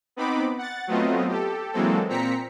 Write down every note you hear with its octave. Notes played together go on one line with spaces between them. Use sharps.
B3 C4 D#4 B5 D6
F#5 A6
F#3 A3 B3 C4 F4 D#5
G4 A4
E3 F#3 G#3 A#3 C4 A4
A#2 C4 A#5 B6 C#7